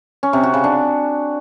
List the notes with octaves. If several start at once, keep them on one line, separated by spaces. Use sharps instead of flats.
C#4
C3
F#4
C#3
D4